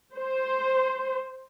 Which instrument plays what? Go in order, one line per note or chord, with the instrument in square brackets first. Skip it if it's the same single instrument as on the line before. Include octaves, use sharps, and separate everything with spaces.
[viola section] C5